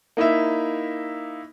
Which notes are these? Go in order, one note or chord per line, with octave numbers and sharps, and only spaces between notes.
A#3 D#4 E4 E5